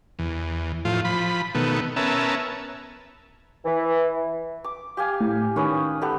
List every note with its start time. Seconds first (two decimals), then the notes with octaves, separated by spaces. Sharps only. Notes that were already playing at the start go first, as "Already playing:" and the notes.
0.19 E2
0.85 A2 F3 F4
1.05 F3 B5
1.55 B2 D#3 A3 B3
1.96 B3 C#4 A#4 E5 A5
3.65 E3
4.64 D6
4.97 G4 F5 G#5
5.20 A2
5.56 D#3 C#4 B4 D#6
6.01 B3 G4 A4